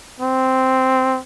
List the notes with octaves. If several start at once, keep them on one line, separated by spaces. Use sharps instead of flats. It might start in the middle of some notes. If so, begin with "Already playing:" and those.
C4